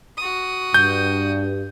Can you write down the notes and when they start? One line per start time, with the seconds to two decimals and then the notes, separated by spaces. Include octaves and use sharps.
0.18 F#4 D#6
0.74 G2 G6